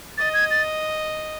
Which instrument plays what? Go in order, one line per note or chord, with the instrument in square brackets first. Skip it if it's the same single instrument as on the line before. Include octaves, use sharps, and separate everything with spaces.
[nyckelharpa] D#5 [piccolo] A6
[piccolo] G#6
A6